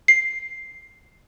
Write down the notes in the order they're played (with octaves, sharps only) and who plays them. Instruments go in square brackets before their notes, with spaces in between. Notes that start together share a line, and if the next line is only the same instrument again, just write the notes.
[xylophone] C7